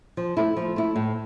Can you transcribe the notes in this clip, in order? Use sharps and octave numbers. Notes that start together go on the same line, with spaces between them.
F3
A3 E4
F3
A3 E4
A2